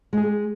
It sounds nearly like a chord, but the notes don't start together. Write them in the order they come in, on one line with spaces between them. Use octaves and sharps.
G#3 G#4 G4